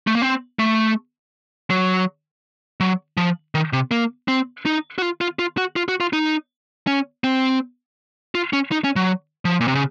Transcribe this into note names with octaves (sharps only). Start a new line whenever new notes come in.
A3
A#3
C4
A3
F#3
F#3
F3
D#3
C3
A#3
C4
D#4
F#4
F4
F4
F4
F#4
F4
F#4
F4
D#4
C#4
C4
F4
C#4
D#4
C#4
F#3
F3
A#2
C3
C#3